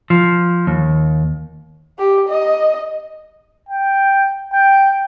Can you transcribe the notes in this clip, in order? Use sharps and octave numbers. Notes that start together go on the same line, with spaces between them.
F3
D#2
G4
D#5
G5
G5